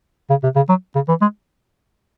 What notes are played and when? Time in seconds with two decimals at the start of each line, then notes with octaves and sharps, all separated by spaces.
0.30 C#3
0.43 C3
0.55 C#3
0.69 F#3
0.95 C#3
1.08 E3
1.21 G#3